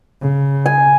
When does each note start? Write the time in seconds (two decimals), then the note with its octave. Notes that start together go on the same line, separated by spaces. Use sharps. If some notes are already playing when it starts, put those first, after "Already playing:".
0.22 C#3
0.66 G#5